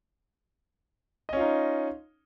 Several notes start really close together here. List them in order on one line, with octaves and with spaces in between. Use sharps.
D#5 C#4 F4 D#4